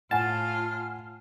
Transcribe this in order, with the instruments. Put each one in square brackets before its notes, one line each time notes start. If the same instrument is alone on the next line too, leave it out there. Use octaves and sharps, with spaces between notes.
[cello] A2 F4 [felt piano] F#5 G#5 [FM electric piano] A5 [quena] F6